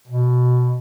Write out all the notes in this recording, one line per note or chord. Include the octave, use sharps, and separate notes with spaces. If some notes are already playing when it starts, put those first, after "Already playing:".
B2